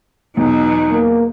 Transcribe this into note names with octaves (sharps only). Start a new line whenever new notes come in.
E2 B2 F#3 D#4
A#3